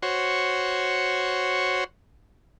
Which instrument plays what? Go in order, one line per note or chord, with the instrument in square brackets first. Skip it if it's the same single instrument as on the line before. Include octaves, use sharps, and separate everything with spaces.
[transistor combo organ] F#4 C5 C#5